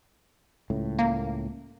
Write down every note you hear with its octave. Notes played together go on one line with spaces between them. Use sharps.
C#2 A2
A#3